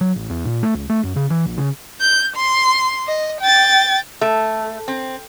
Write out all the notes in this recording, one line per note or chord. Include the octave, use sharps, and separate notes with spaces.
F#3
A1
E2
A#2
A3
C#2
A3
F#2
C#3
E3
A#1
C#3
G6
C6
D#5
G5 A6
A3
C4